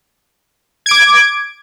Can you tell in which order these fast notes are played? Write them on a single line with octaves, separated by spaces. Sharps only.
G#6 D7 D6